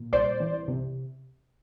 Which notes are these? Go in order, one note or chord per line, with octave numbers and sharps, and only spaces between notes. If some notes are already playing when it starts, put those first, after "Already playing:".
Already playing: A#2
C2 C5 D5
E3
C3